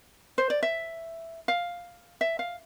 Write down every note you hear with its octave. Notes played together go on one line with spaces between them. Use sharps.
C5
D5
E5
F5
E5
F5